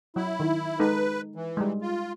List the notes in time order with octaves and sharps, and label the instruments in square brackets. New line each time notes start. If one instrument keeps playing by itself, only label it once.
[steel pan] F#3 [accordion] E4
[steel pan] D#3
[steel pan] G#3 D#4 A4 [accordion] B4
[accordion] E3
[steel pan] G3 G#3
[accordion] F4